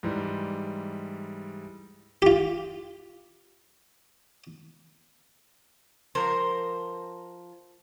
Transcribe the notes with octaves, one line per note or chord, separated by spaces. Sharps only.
G#2 E3 G3
F4 G4
F3 A#4 C5